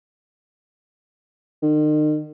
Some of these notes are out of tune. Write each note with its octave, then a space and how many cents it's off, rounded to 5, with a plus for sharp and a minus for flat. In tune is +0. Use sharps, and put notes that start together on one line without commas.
D#3 -40